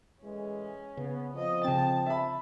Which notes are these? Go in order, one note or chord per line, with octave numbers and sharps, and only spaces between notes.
A2 E3 G#3 C#4
C#3 B3
F2 F3 D#5
C#3 C4 G5 A5
E5 B5